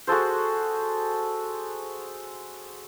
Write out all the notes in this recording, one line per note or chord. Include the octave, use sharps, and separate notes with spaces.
F#4 G#4 A4 C5